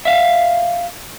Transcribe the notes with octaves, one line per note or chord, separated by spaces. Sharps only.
E5 F5